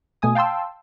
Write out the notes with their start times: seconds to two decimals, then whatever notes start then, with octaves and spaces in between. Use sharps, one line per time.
0.22 B2 A3 G#5 D#6
0.35 F5 G5 A5 C6 E6